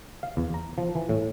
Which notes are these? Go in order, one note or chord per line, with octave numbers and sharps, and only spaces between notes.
F5
E2
A#5
F3
E3
A2